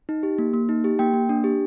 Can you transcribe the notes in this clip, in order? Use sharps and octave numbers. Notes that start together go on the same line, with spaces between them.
D#4
G4
A#3
A#3
D#4
G4
A#3 G5
A#3
D4
G4